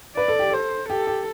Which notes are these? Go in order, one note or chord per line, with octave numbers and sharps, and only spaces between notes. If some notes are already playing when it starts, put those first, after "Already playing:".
B4 D5
A4
G4
A4 C5
G4 A4
G4